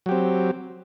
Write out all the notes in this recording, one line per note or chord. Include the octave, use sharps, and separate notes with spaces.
F#3 C4 G4